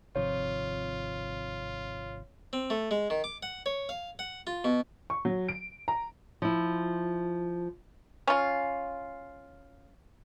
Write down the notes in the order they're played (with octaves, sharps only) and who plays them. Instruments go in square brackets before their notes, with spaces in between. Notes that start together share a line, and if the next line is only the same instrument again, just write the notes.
[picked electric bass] G#1 C3 F3 [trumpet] F4 [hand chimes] C#5
[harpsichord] C4
A3
G#3
D#3
D6
F#5
C#5
F5
F#5
F4
B2
[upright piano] C#6
F#3
D7
A#5
[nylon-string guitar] F3 E4
[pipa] C#4 F4